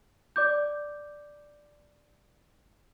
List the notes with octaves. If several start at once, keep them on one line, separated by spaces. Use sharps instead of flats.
D5 D6 G6